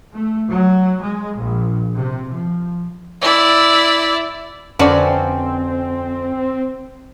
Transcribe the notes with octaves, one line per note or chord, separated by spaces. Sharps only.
A3
F#3
G#3
A#1
C3
F3
E4 D5
F2 D3 C4 C#4 F#4 B4 D5